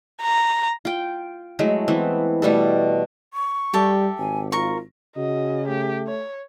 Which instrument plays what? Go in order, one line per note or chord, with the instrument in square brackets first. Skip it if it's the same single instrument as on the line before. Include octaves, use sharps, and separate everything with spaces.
[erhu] A#5
[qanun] F4 G5
F#3 G#3 A3 E4
E3 B3 C4
B2 G3 A3 A4
[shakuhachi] C#6
[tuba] G3 [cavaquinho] G4 A4 E5
[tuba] G#1 [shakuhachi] G#5
[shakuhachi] F4 [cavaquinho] A#4 C#6
[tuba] C#3 [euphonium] F#4 [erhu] D#5
[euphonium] A3 [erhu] G4
[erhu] C#5